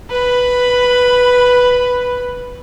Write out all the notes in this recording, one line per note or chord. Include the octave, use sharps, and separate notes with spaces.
B4 B5